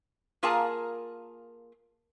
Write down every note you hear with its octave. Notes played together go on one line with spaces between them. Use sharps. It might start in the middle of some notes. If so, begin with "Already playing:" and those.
A#3 F4 G#4 A#4 G#5 A5